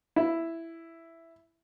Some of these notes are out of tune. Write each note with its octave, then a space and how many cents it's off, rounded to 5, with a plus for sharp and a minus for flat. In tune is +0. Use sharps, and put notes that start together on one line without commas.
E4 +5